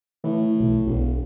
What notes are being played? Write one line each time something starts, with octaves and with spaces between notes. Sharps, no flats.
A2 E3
B1
E1 B1